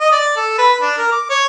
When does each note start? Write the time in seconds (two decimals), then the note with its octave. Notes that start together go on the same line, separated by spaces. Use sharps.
0.01 D#5
0.12 D5
0.37 A4
0.58 B4
0.81 D4
0.98 A#4
1.12 D6
1.30 C#5